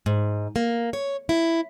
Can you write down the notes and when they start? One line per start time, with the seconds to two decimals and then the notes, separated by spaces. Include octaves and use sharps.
0.06 G#2
0.56 A#3
0.93 C#5
1.29 E4